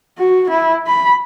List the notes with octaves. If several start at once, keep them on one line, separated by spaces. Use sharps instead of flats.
F#4
E4
B5